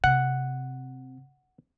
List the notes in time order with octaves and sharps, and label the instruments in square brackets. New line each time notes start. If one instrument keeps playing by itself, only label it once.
[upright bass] C3 [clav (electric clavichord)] F#5